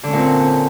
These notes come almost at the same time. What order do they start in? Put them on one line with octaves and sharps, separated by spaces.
D3 C#4 A#2 C4